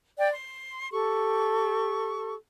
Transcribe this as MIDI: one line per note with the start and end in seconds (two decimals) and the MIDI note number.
0.18 0.30 74
0.18 0.30 79
0.32 0.90 84
0.92 2.34 67
0.92 2.34 69
0.92 2.34 85